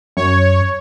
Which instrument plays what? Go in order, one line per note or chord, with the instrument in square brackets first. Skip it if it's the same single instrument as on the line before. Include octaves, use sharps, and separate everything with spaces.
[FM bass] F#2 [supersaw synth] C#5